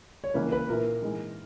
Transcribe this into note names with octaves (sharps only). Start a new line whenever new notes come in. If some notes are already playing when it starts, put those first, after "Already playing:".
C#5
C#2 C#3 E3 A#3 B4
B4
A#2 A#3 E4 A#4
G#2 E3 G#3 D#4 G#4